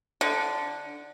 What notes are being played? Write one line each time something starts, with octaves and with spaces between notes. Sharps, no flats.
D3